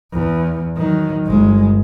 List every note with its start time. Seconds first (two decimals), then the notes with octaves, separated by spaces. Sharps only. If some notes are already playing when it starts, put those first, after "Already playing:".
0.12 E2
0.77 D#3 F#3
1.26 G1 G#3